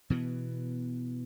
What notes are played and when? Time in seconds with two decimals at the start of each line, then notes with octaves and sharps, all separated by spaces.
0.10 B2 E3 B3